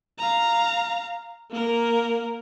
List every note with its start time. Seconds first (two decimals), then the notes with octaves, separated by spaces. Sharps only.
0.18 F5 A#5
1.50 A#3 A#4